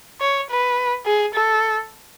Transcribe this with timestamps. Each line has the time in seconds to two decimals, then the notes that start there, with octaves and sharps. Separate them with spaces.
0.21 C#5
0.50 B4
1.05 G#4
1.34 A4